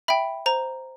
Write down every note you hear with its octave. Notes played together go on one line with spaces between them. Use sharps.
E5 G5 B5
C5 A#5